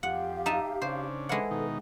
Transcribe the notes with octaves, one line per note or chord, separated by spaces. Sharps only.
F2 G4 F5 F#5
D#4 E5 A5
C#3 D4 C5
G#3 E4 A4 B4 F#5
B2 D#3 D#4